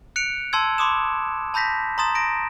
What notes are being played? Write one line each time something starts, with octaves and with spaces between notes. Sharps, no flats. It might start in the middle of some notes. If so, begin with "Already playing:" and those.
F#6 C#7 D7 F7
A5 C6 E6 G#6
B5 C6 D6 D#6 E7
A5 B5 G6 A#6 B6
A#5 C6 D#6 A6 E7
A#6 D7